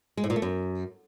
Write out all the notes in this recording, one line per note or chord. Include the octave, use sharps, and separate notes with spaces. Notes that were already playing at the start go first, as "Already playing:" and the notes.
G#3
A2
A#2
A3
F#2